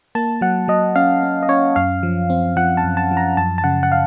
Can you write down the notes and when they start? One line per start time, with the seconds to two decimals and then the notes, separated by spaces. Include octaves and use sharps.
0.15 A#3 A5
0.41 F#3 F#5
0.68 F#3 D#5
0.95 C#4 F5
1.23 C#4
1.43 D#5
1.49 C#4 C#5
1.76 F#2 F5
2.03 F3
2.30 C4
2.56 F3 F#5
2.77 A5
2.84 F#2
2.97 A5
3.11 F3
3.17 A#5
3.37 F#2 A5
3.58 A5
3.64 C#3 F#5
3.83 F#5
3.92 F5